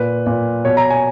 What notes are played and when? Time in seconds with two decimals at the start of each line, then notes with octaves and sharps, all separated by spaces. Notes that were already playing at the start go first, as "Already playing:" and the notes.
Already playing: A#2 B4
0.26 A#2
0.65 B2 C#5
0.77 A#5
0.90 G#5